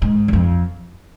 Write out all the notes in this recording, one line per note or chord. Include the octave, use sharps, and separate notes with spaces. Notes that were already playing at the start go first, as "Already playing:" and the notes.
G#2
E2
F2